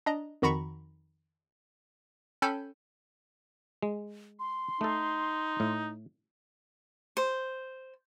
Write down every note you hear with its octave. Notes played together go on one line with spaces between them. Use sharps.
D4 D#5 A#5
F2 D#3 F#4 A#5 B5 C#6
C#4 A4 G5 G#5 B5 G6
G#3
C6
A3 D#4 A4
A2
C5